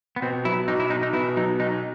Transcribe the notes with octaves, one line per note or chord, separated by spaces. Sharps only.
B3
B2 C4
F#3 E4
B1 D#4
E4
B1 D#4
D#4
B2 E4
F#3 D#4
B1 D#4